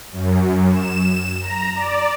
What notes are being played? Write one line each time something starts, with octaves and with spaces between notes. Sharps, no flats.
F#2
E7
A#5
D5